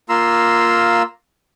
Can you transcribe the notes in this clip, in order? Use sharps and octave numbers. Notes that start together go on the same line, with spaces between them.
A#3 F4 A#5 C6 E6